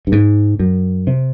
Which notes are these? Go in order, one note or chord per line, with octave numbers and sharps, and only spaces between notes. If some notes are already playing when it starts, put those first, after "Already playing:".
G2
G#2
F#2
C3